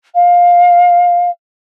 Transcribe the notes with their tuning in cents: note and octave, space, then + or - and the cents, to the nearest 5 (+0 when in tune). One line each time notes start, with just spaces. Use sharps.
F5 +15